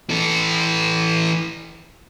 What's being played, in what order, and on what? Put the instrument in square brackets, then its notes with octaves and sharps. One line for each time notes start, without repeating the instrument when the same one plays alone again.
[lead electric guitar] E3 A4